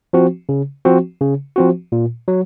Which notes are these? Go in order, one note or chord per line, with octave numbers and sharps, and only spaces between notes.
F3 C4 F#4
C#3
F3 C4 F#4
C#3
F3 C4 F#4
A#2
F#3